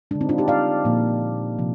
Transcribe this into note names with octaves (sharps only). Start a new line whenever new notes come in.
D3 G#3 D4
C4 D#4
D4 F4
D#4 G4
D5 F5
A#2 F3 A#3
C3 F3